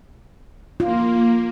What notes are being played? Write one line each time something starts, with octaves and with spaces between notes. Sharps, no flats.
A#3 F4